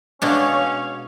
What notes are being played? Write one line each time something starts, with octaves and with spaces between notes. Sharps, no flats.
B2 G#3 C#4 D4 C#5 F5